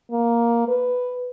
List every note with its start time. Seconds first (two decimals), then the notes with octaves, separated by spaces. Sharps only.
0.11 A#3
0.68 B4